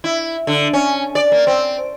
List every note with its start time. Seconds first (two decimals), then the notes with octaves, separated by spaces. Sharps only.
0.04 E4
0.47 D3
0.73 C#4
1.15 D5
1.32 A#3
1.47 C4